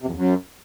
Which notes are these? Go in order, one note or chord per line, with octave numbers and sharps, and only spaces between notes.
C3
F2
E2
F#2